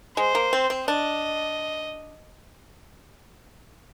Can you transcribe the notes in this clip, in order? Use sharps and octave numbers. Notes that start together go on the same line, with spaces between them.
G#3 C5
A#3
C4
C4
D4 D#5